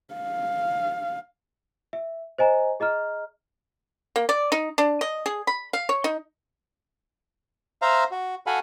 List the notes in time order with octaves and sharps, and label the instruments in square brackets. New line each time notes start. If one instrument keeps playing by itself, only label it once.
[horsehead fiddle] F5
[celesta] E5
C5 D#5 G#5 A#5
G#4 D#5 A#5 F6
[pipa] A#3
D5
D#4
D4
D#5
G#4
B5
F5
C#5
D#4
[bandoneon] C5 E5 F5 A#5
F#4
F#4 A4 F5 F#5 G#5 B5